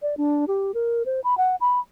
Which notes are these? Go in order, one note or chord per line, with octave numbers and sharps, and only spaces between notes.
D5
D4
G4
A#4
C5
B5
F#5
B5